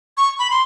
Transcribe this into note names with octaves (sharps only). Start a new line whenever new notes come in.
C#6
B5
C6